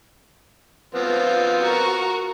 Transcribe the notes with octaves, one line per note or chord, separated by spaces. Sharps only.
F3 B3 C4 F4
F#4 A#4